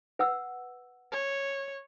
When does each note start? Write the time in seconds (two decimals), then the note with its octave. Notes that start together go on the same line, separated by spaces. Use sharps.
0.19 B4 F#5 E6
1.12 C#5